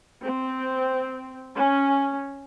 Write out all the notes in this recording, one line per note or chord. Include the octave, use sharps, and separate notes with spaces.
C4
C#4